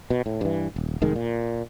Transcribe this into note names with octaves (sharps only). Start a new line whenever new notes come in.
B2
A2
G2 E3
D#1
F1 D#3 G#3
A#2